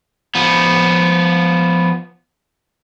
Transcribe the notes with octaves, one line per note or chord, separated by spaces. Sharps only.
F3 B3